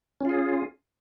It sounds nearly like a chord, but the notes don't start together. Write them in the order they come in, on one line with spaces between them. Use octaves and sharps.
C#4 F4 G#4